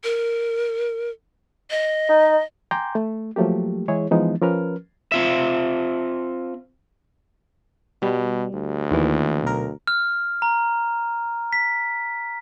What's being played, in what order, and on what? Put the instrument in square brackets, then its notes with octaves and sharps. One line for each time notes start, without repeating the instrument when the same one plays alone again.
[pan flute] A#4
D#5
[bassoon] D#4
[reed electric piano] G5 G#5 A#5 C6 D6 G6
A3
F3 F#3 A3 A#3 G4
E3 G#3 E4 G#4 C#5
E3 F3 G#3 B3 D#4
F3 C#4 A#4 B4 F6
[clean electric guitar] C4 F4 E5
[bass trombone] B2 [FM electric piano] G3
[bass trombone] D2
[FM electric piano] D#2 E3
B1 A#4
[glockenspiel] F6
A#5
B6